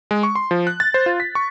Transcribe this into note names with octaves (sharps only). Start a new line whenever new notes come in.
G#3
C#6
C6
F3
F#6
A6
C5
F4
B6
C#6